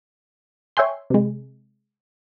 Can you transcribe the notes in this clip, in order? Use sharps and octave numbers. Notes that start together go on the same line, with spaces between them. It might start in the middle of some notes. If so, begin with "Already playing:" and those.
C#5 E5 G5 G#5 C6
C3 G#3